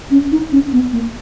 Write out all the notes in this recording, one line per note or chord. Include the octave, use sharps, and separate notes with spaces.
C#4
D#4
C#4
B3
A#3